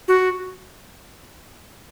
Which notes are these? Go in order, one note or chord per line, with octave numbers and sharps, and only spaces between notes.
F#4